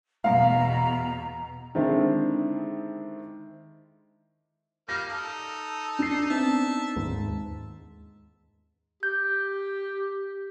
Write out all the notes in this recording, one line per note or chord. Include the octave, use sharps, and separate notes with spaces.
E2 B2 F5 A#5
D3 D#3 G#3 C4 D4 E4
G3 A#3 F5 A#6
D#4 A4
D4 C7
B3 C4 D#4 E5 A5
D#2 G#2
G4 G6